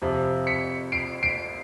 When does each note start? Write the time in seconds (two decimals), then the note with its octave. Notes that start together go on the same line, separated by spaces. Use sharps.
0.02 F2 C3 F3
0.47 B6 C#7
0.92 C7 D7
1.23 C7 D7